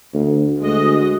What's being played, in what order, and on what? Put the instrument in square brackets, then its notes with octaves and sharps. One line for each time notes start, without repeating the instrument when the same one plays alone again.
[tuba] D2
[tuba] D2 [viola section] G#3 F#4 D#5